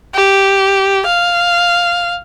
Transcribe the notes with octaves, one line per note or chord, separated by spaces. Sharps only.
G4
F5